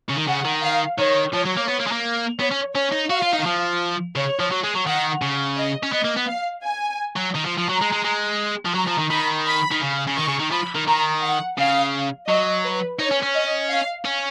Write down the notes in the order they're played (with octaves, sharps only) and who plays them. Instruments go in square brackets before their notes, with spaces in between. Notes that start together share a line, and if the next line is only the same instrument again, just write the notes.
[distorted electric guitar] C#3
D#3
[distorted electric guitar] C#3 [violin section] F#5
[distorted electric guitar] D#3
[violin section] F5
[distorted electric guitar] D#3 [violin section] C#5
[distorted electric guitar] F3 [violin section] C#5
[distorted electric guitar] F#3
A#3
B3
A#3
G#3
A#3
[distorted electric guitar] B3 [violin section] C#5
[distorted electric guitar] C#4
[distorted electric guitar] C#4 [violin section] C#5
[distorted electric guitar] D#4
[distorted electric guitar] F#4 [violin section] F5
[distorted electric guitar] F4
D#4
D#3
F3
[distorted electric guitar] C#3 [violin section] C#5
[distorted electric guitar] F3
F#3
G#3
F#3
[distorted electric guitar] D#3 [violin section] F#5
[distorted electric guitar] C#3
[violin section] D#5
[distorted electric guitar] C#4
[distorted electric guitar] B3 [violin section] D#5
[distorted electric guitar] A#3
B3
[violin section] F5
G#5
[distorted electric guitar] F#3
D#3
F3
F3
[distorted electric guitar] F#3 [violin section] A#5
[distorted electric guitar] G#3
G#3
G#3
F3
[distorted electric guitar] F#3 [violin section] A#5
[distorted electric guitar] F3
D#3
[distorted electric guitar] D#3 [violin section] B5
[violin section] B5
[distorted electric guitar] D#3
C#3
C#3
[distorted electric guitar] D#3 [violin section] C#6
[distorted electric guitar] C#3
D#3
[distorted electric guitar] F3 [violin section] B5
[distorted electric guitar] D#3
[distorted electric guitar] D#3 [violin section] A#5
[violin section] F#5
[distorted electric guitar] C#3 [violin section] F5
[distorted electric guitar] F#3 [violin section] D#5
[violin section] B4
[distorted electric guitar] D#4 [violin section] C#5
[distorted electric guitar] C#4
C#4
[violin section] D#5
F5
[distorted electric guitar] C#4